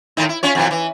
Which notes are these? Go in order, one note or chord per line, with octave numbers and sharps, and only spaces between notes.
A2 D#3 D#4
E4
C#4 F4 C#5
F2 B2 E3
E3